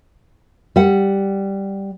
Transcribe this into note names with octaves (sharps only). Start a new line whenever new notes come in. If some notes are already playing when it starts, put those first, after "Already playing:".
G3 F#5